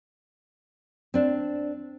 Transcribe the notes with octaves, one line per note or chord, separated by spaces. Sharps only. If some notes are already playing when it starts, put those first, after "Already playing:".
C4 D4